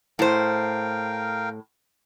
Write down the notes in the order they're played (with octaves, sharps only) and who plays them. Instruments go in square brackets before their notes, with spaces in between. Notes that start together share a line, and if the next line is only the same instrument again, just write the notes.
[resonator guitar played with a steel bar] A2 C5 [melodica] A#4 F5 G5